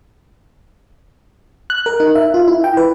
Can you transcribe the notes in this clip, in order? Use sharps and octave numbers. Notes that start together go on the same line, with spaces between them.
F#6
A#4
D#4
E5
F4
E4
G5
B4